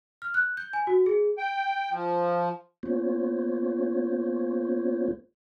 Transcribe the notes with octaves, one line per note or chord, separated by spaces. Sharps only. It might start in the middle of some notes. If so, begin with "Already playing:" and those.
F6
F#6
G6
G#5
F#4
G#4
G5
F3
A#3 B3 C#4 F4 C5 C#5